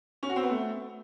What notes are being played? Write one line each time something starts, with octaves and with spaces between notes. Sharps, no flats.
C#4
F#4
C4
B3
A3